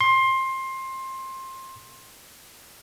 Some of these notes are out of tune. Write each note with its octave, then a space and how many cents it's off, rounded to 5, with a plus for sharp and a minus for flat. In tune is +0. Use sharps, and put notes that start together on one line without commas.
C6 +20